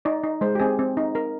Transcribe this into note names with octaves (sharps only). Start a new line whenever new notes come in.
D#4 D5
D#4
G#3 C5
G4
C4 G#4
C4
D#4
D#4 A#4